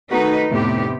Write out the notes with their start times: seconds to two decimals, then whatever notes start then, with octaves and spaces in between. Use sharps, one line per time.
0.11 D#3 A3 D#4 F#4 B4
0.51 F1 A2 C3 B3 G4